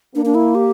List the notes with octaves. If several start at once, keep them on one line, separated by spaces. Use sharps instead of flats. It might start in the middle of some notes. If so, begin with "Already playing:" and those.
A#3 D4
D4
E4
G4